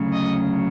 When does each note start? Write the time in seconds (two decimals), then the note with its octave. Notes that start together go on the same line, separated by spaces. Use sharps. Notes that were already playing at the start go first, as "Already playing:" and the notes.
Already playing: D2 C#3 F#3
0.12 D#5